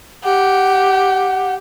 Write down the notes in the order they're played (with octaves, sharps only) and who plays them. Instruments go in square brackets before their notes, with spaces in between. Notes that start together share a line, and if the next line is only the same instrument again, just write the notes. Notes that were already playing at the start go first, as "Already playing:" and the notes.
[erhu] G4 [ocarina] F#5